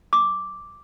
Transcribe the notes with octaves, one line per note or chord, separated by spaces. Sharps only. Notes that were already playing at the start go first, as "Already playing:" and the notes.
D6